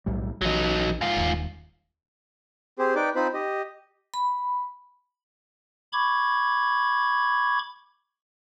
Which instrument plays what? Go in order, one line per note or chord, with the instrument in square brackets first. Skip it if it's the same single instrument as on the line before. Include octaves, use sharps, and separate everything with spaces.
[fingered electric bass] B1 A2 G3
[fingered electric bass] A#1 E3 [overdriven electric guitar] F#3 D#4
[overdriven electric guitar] G#2 F4
[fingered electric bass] D#1 D#2
[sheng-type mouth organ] C4 G4 G#4 C5
D#4 B4 D5 G5 D6
C4 D#4 F4 C5 B5
G4 D#5
[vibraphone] B5
[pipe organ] B5 C#6 D6 G#6